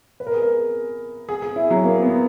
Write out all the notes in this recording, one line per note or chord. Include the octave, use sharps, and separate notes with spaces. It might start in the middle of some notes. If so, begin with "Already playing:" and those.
B4
A#4
G#4
A#4
G#4
G#4
E4
F#3
A#3
B3